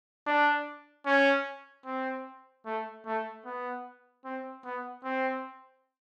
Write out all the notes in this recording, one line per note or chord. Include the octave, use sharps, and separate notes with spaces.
D4
C#4
C4
A3
A3
B3
C4
B3
C4